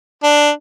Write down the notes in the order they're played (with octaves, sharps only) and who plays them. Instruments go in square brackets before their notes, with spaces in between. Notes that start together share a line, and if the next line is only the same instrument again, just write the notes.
[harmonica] D4